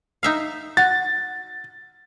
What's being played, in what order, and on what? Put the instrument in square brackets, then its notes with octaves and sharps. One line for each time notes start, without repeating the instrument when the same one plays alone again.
[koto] D#4 E5 F5
[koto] F#4 [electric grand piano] A6